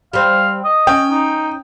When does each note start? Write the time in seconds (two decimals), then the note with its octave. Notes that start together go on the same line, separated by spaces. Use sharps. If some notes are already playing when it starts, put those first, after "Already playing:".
0.13 G3 C4 F5
0.65 D#5
0.87 C#4 G5
1.10 D#4